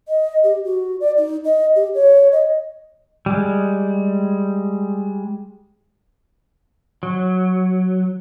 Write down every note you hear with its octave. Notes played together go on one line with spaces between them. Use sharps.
D#5
G4
F#4
D5
D#4
D#5
G4
C#5
D#5
G3 G#3
F#3